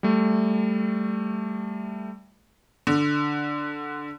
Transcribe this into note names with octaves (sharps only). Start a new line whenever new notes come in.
G3 A3
D3